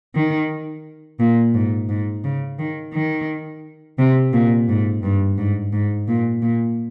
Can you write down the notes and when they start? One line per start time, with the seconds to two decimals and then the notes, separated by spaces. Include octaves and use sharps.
0.15 D#3
1.20 A#2
1.54 G#2
1.89 G#2
2.24 C#3
2.59 D#3
2.94 D#3
3.99 C3
4.33 A#2
4.69 G#2
5.03 G2
5.38 G#2
5.73 G#2
6.08 A#2
6.42 A#2